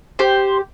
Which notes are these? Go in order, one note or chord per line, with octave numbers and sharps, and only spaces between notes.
G4 C5